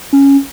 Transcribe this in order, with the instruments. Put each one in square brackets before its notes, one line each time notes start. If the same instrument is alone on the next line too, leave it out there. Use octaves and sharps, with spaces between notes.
[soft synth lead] C#4